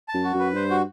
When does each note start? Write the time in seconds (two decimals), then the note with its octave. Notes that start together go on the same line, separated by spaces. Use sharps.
0.08 A5
0.14 F#2
0.24 F#4
0.35 F#2 B4
0.55 G2 C5
0.70 F#4